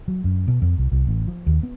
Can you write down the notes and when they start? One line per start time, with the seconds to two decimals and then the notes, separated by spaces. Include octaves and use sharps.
0.08 F#3
0.24 F#2
0.48 B2
0.62 F2
0.78 C2
0.92 C2
1.07 A1
1.28 F3
1.47 D#2
1.63 B3